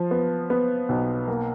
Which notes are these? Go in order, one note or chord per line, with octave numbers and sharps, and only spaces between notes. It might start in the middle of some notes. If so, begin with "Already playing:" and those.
Already playing: F3
B3
B3
B1
A#3